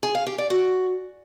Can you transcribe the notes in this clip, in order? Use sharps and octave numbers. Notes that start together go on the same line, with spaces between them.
G#4
F5
G4
D5
F#4